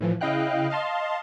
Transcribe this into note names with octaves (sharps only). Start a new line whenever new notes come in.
A2 E3 F3
C#3 E4 D#5 F5 G5 F#6
D#5 F5 A5 C6